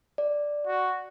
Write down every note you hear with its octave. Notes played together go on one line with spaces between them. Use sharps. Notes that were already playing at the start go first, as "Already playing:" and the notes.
D5
F#4